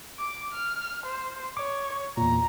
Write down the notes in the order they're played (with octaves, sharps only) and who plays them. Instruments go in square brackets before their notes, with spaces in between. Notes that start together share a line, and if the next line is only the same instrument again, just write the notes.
[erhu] D6
F6
C5
[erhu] C#5 [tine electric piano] D6
[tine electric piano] E2 A#2 [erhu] A#5